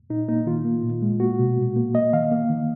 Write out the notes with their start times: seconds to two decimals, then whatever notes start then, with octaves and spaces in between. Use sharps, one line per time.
0.10 A#2 D#4
0.28 A#3 D#4
0.46 D#3 F4
0.65 A#3
0.83 A#2
1.02 G#3
1.20 A#3 F#4
1.39 B2
1.58 A#2
1.76 A#3
1.94 A#3 D#5
2.13 D#3 F5
2.31 A#3
2.50 D#3